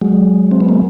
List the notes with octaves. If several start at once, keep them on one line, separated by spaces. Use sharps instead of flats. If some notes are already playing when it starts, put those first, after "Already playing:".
F#3 G#3
C4
B3
A#3